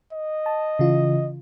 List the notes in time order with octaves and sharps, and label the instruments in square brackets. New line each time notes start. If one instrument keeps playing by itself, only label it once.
[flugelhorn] D#5
[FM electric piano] A5
C#3 E3 F4